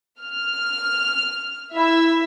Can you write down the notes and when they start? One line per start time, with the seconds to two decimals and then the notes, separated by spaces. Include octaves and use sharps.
0.21 F6
1.74 E4 E5